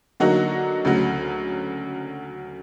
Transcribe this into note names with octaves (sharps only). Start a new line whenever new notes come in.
D3 F#3 A#3 D#4 F#4
D2 C#3 F#3